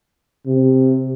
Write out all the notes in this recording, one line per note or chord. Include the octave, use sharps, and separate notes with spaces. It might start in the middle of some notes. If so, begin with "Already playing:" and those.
C3